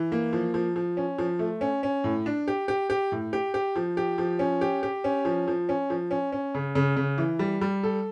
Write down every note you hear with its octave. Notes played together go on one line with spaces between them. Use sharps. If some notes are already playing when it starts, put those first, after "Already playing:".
Already playing: E3
A#3
F3
F3
F3
C#4
F3
A3
C#4
C#4
A2
D4
G4
G4
G4
A2
G4
G4
F3
G4
F3
C#4
G4
G4
C#4
F3
F3
C#4
F3
C#4
C#4
C#3
C#3
C#3
E3
G3
G3
A4